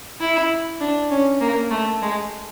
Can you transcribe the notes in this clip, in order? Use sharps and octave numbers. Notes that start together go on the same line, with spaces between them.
E4
D4
C#4
A#3
A3
G#3